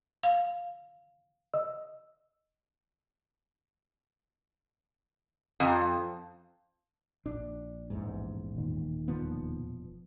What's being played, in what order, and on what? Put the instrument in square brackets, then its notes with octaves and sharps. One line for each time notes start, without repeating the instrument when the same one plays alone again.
[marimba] F5
[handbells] D#5 E6
[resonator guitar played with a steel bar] F2
[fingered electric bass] A#1 [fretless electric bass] D4
[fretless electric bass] A1 E2 G#2
[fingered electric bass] D#1 A#2 D#3
[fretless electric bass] E1 F3 B3